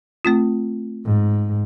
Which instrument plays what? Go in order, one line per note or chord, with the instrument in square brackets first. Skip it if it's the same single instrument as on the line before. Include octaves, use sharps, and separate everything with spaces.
[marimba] A3 C4 F4
[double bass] G#2